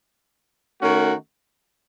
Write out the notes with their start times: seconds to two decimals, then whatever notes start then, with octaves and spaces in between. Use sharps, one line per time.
0.81 D#3 A3 C#4 F#4